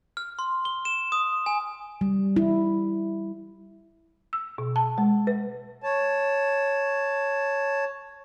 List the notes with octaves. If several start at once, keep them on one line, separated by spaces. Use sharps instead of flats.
F6
C6
G7
E7
D#6
G#5
G3
E4
E6
B2
A5
G#3
B4
C#5 A5